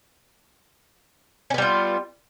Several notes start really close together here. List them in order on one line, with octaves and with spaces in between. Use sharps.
C#4 B3 G3 F4